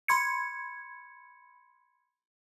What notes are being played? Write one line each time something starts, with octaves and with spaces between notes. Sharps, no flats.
B5 C6 G#6 C#7